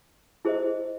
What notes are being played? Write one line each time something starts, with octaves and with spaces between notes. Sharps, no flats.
E4 G#4 C5 D#5